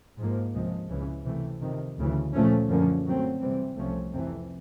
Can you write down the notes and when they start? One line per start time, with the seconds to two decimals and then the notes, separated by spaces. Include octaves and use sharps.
0.18 G#2 F3 A#3
0.54 C#2 C3 F3 G#3
0.90 C#2 C#3 E3
1.25 C3 E3 A3
1.62 F2 C3 D#3
1.98 D2 C#3 E3
2.33 A#2 F3 A3 C#4
2.69 F#2 D3 F3 A#3 C#4
3.05 A2 F#3 A3 C4
3.41 C3 E3 G3 C4
3.76 C2 C3 F3 A3 C#4
4.12 F2 C3 E3